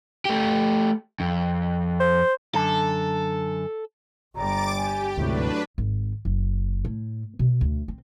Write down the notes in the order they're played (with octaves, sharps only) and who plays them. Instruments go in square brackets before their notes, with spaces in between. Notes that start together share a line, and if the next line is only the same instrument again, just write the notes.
[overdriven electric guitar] A3 G4
F2
[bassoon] C5
[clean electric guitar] F#2 D3 A5 [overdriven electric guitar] A4
[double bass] G1 G3 [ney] A#5 [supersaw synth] D6 A6 D7
[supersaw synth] G4 [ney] G#5
[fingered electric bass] D2 G#2 C3 [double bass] F#3 A3 [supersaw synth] D4 B4 [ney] E4
[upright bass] G#1
F#1
A2
B2
D2
C4